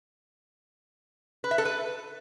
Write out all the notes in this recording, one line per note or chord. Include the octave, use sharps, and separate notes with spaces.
B4
E5
A4
B4